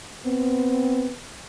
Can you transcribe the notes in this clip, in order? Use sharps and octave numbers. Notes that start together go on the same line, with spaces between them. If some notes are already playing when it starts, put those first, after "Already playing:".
B3 C4